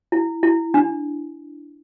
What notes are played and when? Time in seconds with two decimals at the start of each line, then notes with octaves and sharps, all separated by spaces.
0.12 E4
0.43 E4
0.74 D4